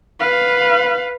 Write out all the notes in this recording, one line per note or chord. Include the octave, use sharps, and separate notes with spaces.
B4 F5